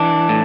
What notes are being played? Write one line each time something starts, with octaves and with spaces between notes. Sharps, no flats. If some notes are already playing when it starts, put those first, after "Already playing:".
Already playing: E3 D4
A2